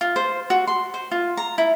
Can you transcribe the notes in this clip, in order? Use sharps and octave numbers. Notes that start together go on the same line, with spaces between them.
F4
C5
F#4
C6
C5
F4
A#5
E4